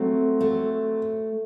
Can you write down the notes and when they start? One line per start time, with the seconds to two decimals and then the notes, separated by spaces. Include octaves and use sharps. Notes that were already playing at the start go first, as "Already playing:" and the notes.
Already playing: F#3 A3 C4
0.41 A3